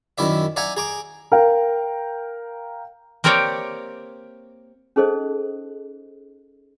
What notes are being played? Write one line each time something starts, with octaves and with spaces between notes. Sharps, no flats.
F#2 D#3 E4 D5 E5
D5 E5 F#5 G#5 A#5
G#4 A#5 D6
A#4 F5 G5
A#3 C4 G4 A#4 C#5 D5
C#4 D#4 G#4 A4 C5 D#5